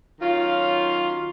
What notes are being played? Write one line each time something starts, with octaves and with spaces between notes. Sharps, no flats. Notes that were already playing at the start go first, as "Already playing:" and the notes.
D#3 F#3 C#4 F4